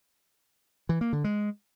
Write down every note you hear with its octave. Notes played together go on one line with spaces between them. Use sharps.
E3
A#3
D3
G#3